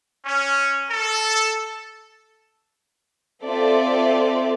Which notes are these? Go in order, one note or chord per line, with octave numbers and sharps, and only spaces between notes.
C#4
A4
C4 F4 A4 D5 E5